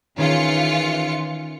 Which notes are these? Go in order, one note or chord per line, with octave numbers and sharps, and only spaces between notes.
D#3 E3 C#4 F4 G#4 C#7